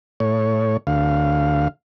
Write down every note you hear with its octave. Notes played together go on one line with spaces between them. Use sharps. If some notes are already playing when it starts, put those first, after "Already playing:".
A2 C#5
D2 F5